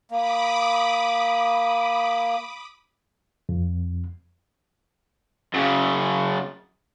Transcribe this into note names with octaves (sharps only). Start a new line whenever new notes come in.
A#3 B5 D6 D#6
F2
F#2 C#3